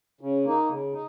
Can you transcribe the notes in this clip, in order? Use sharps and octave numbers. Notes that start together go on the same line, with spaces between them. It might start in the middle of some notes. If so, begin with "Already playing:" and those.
C#3
A#3 D#4
C#3
D#4